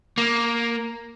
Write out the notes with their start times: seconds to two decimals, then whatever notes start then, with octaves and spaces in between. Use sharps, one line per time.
0.18 A#3